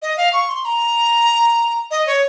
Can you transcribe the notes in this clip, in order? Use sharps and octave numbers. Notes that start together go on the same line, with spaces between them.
D#5
F5
C#6
C6
A#5
D#5
C#5